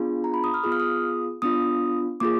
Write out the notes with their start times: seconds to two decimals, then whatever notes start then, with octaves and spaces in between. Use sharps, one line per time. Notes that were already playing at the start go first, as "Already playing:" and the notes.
Already playing: B3 D4 F4 G#4
0.24 A#5
0.34 B5
0.44 D#6
0.54 F6
0.64 B3 F4 G#4 D#6
0.72 F6
0.80 D#6
1.42 B3 D4 F4 D#6
2.20 A#3 F4 G#4 D6